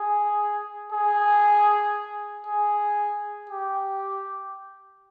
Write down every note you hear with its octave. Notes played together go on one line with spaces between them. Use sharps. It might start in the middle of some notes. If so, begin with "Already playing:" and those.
Already playing: G#4
G#4
G#4
G4